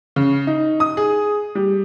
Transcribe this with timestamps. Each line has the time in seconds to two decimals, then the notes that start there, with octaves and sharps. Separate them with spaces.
0.16 C#3
0.47 D#4
0.80 D#6
0.97 G#4
1.55 G3